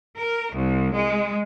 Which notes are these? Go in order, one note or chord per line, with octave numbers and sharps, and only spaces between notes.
A#4
C2
G#3